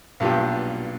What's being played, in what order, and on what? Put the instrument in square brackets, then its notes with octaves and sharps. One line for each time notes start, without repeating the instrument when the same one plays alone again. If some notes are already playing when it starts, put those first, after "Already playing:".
[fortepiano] B1 G2 A#2 G4